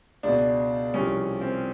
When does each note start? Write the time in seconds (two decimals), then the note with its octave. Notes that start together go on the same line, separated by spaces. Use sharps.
0.23 C#2 B2 D4
0.94 C2 C3 F3 C#4
1.41 C4